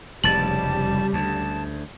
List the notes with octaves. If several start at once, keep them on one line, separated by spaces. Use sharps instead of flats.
F1 E2 G#2 C#3 G3 A5 A6 F#7
D2 A5